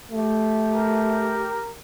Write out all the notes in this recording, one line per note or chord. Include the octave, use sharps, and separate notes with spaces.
A3 G4
A#4